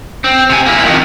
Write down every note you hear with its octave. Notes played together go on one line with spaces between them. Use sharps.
C4
C3 G#5
A#3 E4
F2 D#3